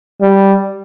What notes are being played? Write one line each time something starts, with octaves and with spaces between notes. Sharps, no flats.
G3